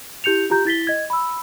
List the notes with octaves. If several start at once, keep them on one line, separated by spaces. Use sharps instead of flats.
E4 G4 G6 C#7 F7
F4 G4 A#5 G6
E4 A6 B6 G7
D#5 G#6
B5 E6